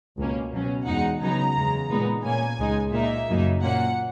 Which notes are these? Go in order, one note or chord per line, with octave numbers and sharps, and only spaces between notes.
C#2 B2 A#3 C#4
B2 F#3 C#4
E2 B2 G#3 D#4 F#5
C#3 F#3 B3 D#4 A#5
E2 C#3 G#3
A#2 G#3 B3 D#4
A#2 A#3 C#4 G#5
C#2 C#3 G#3 D#4
A#2 A#3 D#4 E5
F#2 C#3 F#3 A#3 D#4
A#2 A#3 C#4 F#5